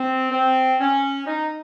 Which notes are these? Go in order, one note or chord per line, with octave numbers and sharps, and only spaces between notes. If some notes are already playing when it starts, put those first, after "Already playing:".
Already playing: C4
C4
C#4
D#4